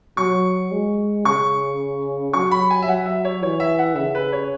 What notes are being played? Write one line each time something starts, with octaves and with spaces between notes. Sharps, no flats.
F#3 C#6
G#3
C#3 C#6
F#3 C#6
B5
G#5
E5
F#3 F#5
E5
C#5
E3 C#5
E5
F#5
C#3 E5
B4
C#5